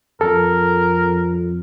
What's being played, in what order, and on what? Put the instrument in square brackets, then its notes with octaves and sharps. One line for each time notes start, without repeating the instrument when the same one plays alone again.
[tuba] F2 [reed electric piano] A4 [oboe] A#4